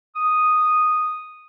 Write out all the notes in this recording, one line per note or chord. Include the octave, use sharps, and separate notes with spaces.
D#6